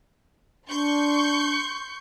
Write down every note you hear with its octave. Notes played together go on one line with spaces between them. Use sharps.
D4 C6 C#6 G6